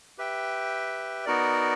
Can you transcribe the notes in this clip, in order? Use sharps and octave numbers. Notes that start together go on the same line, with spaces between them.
G4 B4 E5 G5
B3 D#4 F#4 A#4 D5